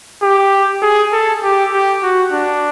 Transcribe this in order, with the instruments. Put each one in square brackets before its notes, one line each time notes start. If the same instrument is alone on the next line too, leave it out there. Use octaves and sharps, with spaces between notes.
[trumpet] G4
G#4
A4
G4
G4
F#4
D4